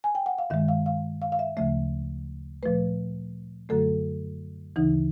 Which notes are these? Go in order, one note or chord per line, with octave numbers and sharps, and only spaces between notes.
G#5
G5
F#5
F5
G2 D#3 G#3 E5
F5
F5
F5
F5
E5
D2 C#3 F3 A3 E5
A#2 F3 A3 B4
F#2 D3 F#3 A3 A4
D2 C#3 E3 D#4